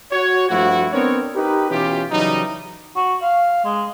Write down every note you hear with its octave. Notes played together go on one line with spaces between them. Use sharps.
F#4 C#5
G2 F3 A3 E4 F#4
B3 C4 D4 A#4 C#5
D#4 G4 A#4 B4
B2 E3 C#4 F4 G4
C#3 E3 F#3 G3 D#4
F#4
F5
G#3